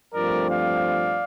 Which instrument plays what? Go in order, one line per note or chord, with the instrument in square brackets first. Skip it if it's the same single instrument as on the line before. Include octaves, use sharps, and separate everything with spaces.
[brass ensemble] G2 F3 A3 C4 A#4 D5
D5 F5